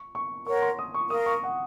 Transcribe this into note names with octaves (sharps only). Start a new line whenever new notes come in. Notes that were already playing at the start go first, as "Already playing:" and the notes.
Already playing: C#6
C#6
A#4 C#5 F#5 C#6
C6
D#6
C#6
A#4 F5 C6 D#6
C#6
F#5